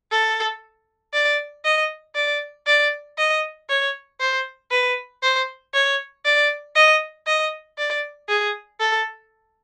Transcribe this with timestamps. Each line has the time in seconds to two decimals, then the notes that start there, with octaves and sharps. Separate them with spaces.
0.11 A4
1.13 D5
1.64 D#5
2.15 D5
2.67 D5
3.18 D#5
3.69 C#5
4.20 C5
4.71 B4
5.22 C5
5.74 C#5
6.25 D5
6.75 D#5
7.27 D#5
7.78 D5
8.29 G#4
8.80 A4